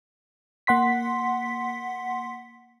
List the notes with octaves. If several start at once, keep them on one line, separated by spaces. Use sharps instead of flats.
A#3 F#5 C6 B6